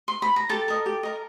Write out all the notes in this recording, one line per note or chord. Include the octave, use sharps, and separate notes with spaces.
C6
B5
A#5
G4 A4 A5
A#4 D#5
G4
A#4 D#5